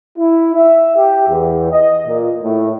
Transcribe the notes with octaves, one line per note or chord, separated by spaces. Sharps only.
E4
E5
G4
E2
D#5
A#2
A2